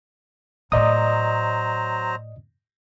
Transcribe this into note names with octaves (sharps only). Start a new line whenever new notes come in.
A2 F#3 A3 C5 D5 D#5 A#5 D#6